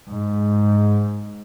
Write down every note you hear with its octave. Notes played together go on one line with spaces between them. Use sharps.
G#2